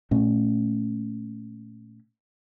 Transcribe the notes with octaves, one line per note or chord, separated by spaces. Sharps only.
A#2 A3 C#4